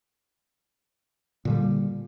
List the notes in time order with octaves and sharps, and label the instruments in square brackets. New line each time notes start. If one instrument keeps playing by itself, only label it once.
[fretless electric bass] A#2 D3 G3